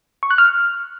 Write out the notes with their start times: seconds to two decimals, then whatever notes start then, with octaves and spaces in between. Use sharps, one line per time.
0.23 C#6
0.31 F#6
0.38 F6